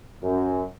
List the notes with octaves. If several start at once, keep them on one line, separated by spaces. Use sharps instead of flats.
F#2